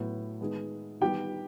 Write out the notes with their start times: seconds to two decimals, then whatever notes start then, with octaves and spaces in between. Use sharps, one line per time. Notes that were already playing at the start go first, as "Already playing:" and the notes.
Already playing: A2 F#3 B3
0.41 D#3 G#3 B3
1.01 D#3 G3 B3 G4 G5